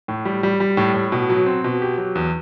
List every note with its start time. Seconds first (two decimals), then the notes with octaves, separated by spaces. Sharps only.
0.08 A2
0.25 G3
0.43 G3
0.60 G3
0.77 A2
0.94 A2
1.12 B2
1.30 F#3
1.46 C4
1.64 B2
1.82 G4
1.98 F#3
2.15 E2